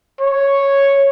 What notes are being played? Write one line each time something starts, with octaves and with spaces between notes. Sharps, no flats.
C#5